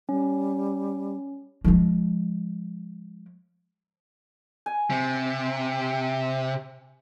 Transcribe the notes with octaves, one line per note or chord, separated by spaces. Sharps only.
G3 C#4
F3 G#3
G#5
C3